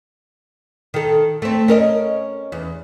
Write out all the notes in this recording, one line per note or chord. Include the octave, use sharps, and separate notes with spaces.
D#3 A4
A3 C4
C#4 A#4 D#5
E2